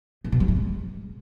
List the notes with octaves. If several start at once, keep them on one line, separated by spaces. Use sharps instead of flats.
A2
B2
G3
G2
G#3